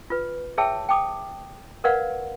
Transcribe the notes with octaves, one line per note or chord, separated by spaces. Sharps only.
F4 B4
G#4 C#5 E5 G5 A5 E6
G5 A5 D6 D#6
A#4 B4 D5 F5 F#5